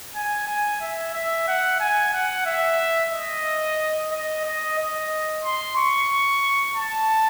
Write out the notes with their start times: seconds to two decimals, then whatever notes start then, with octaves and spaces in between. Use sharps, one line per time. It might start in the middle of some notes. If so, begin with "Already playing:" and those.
0.15 G#5
0.47 G#5
0.81 E5
1.14 E5
1.48 F#5
1.80 G#5
2.13 F#5
2.46 E5
3.13 D#5
4.11 D#5
4.45 D#5
4.78 D#5
5.44 C6
5.76 C#6
6.76 A5